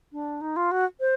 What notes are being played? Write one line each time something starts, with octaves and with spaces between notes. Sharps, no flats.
D4
D#4
F4
F#4
C5